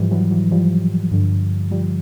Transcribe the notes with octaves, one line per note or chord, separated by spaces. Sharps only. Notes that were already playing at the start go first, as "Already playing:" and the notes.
Already playing: G#2 E3 F3 G3
E3 F#3
E3 F#3
F3 G3
G2 D3
F3 G3